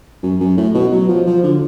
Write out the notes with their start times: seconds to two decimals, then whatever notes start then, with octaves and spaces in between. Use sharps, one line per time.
0.23 F#2
0.40 F#2
0.57 A2
0.74 B2
0.92 F#3
1.09 F3
1.27 F3
1.44 D3